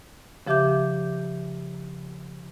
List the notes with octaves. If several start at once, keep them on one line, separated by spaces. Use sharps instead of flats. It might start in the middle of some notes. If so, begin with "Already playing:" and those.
C#3 F3 G4 E5 D6 G6